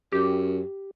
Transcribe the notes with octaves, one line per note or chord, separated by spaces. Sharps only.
F#2 G4